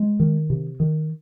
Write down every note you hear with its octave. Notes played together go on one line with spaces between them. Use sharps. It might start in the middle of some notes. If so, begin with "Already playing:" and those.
Already playing: G#3
D#3
C3
D#3